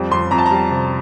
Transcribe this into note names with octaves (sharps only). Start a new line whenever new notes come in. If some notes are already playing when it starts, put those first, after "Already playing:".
Already playing: F2 G3
F2 C6
F2 A#5
A5
A#5
G3
C3